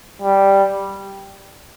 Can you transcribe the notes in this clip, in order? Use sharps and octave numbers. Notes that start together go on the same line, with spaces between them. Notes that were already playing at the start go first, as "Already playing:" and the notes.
G3